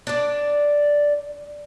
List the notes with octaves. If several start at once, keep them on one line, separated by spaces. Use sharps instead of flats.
D4 D5